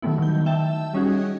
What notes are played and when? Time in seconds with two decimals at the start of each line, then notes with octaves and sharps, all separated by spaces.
0.02 D#3 F#3 G3 A3 B3 E4
0.18 D#3 F#3 G6
0.46 E5 G5 A5
0.93 G3 C#4 D#4 F#4 G#4